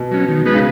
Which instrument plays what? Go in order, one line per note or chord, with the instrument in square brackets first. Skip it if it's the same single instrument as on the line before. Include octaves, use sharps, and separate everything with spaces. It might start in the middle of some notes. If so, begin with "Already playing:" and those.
Already playing: [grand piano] B2
[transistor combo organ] F#3 C#4
D#3
G#3 B3 D#4 B4
[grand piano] C#3